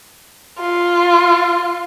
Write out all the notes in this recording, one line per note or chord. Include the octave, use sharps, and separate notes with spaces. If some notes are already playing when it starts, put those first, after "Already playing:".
F4